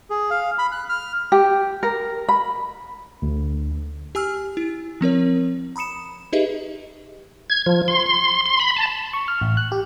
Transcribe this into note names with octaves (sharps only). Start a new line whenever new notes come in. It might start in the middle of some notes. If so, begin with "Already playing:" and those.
G#4
F5
B5
F#6
F6
G4
A#4
B5
D2
G4 G#5 E6 F6
E4
F3 C4 A#4 C#5
A#5 B5 D#6 C#7 E7
D#4 G4 G#4 B4 D#5 E5
G#6
F3
C6
C6
C6
B5
A5
C#6
F6
A1
F#6
G4